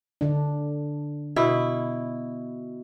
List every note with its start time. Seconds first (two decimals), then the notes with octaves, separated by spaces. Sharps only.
0.21 D3 D4
1.36 B2 E4